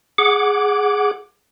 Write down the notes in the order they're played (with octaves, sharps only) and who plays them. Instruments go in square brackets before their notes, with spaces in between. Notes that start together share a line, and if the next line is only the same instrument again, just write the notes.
[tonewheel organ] G#4 F#5 D6